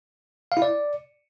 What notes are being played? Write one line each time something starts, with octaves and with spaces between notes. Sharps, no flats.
F5
E4
D5